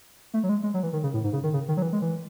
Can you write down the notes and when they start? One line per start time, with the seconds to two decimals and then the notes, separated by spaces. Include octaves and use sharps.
0.34 A3
0.44 F#3
0.49 G#3
0.63 G#3
0.74 F#3
0.83 E3
0.93 D#3
1.03 C#3
1.14 A2
1.24 G#2
1.33 C#3
1.44 D#3
1.54 C#3
1.68 D#3
1.77 F#3
1.82 E3
1.93 G#3
2.02 E3